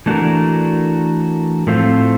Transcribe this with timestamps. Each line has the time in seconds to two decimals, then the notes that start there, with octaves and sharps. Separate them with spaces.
0.06 E3 A3 D4 F#4 A#4
1.67 A2 F3 A3 C4 F4